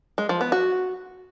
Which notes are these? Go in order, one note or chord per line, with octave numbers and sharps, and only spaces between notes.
G#3
F3
B3
F#4